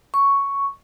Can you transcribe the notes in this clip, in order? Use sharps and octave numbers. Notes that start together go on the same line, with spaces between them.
C#6